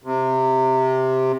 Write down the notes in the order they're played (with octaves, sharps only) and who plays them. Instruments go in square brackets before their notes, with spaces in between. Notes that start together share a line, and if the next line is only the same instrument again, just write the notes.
[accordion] C3